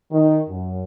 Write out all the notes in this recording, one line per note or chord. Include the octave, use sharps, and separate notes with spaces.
D#3
F#2